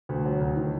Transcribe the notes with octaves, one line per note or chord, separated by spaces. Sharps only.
D2
F#3
D2
D#3